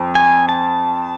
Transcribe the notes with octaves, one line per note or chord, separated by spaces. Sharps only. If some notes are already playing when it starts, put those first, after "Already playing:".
Already playing: F2
G#5
A5